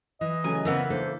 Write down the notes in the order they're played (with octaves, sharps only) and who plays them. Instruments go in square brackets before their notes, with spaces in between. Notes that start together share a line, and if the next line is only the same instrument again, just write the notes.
[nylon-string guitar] E3 [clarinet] D#5
[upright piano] C#3 F#3 A3 [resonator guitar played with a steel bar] G#5
[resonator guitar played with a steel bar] C#3 E3 [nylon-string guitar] B3 C4 A#4 [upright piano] F#5 E6
[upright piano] A#3 [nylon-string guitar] D4 A4 [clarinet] C5